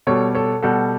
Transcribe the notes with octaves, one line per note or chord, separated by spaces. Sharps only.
B2 G3 A4 C#5
A4 C#5
B2 G3 F#4 A4